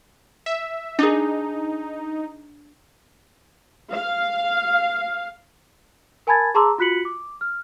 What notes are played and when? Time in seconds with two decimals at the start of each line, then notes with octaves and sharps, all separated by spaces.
0.46 E5
0.99 D4 D#4 G#4
3.92 F5
6.27 A#4 G#5 A5 B5 G#6 A6
6.54 G#4 A5 A#5 C6 D6 E6
6.78 F4 F#4 F#6 B6 C#7 F#7
7.05 D6
7.41 F6